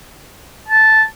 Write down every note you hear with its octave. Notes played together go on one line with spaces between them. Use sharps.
A5